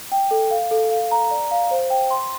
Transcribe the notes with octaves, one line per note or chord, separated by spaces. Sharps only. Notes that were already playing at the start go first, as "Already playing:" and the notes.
G5
A4
F5
A4
F5
A#5
D5
F5
C5
G5
C6